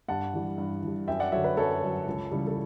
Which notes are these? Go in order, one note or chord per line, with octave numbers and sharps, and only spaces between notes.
G2 F#5 A5
E3 G3
G2
E3 G3
F#2 E5 G5
D5 F#5
D3 F#3 C#5 E5
B4 D5
F#2 A4 C#5
D3 F#3
C#2
C#3 E3 G3
A4